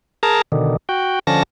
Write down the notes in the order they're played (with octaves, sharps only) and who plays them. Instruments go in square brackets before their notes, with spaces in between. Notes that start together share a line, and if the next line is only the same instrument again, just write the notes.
[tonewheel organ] G#4 A#4 A5 A#5
B2 D3 D#3
F#4 G5
D3 F3 C#4 A5 A#6